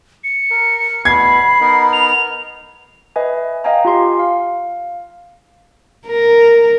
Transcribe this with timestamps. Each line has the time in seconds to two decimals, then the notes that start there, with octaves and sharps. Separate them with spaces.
0.24 C#7
0.51 A#4
1.05 E2 B2 B5 G#6 C7
1.61 B3 D#4 A#4
1.93 F7
3.16 B4 D#5 E5 G#5
3.64 D#5 F5 G5 G#5 A#5
3.85 F4 G4 C6
4.19 F5
6.08 A#4